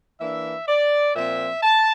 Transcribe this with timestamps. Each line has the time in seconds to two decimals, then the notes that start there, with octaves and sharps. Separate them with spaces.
0.20 E3 A#3 D4 E5
0.68 D5
1.15 A#2 F3 C4 E5
1.63 A5